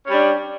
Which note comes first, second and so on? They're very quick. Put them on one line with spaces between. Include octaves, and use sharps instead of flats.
C#4 G3 D4